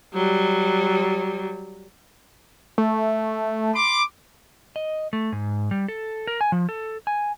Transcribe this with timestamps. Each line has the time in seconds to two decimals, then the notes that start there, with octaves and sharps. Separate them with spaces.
0.14 F#3 G3
2.78 A3
3.74 B5 C6 D6
4.76 D#5
5.13 A3
5.32 G#2
5.71 G3
5.88 A4
6.27 A#4
6.41 G#5
6.52 F3
6.69 A4
7.07 G#5